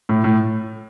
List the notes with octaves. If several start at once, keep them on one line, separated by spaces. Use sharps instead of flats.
A2
A2